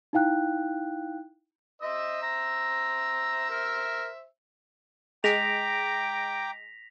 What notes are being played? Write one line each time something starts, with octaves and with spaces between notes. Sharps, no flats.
D#4 E4 F5 G5 F#6
C5 D#5 E5 E6
A#5
A#4
G#3 G5 A#5 D6 A#6 B6 F7